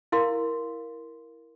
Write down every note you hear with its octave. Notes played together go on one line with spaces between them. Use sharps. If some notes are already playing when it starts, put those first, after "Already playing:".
E4 A#4 F5 C6